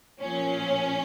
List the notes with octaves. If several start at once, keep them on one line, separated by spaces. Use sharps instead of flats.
A#2 F3 C#4